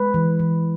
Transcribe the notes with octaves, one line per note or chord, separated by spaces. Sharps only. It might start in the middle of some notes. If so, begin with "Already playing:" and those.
Already playing: G#3 B4
E3
E3